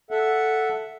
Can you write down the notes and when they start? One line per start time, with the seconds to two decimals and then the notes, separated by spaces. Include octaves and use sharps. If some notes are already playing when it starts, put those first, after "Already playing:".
0.11 A4 E5 F#5